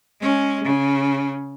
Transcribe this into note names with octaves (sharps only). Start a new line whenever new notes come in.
G#3 C#4
C#3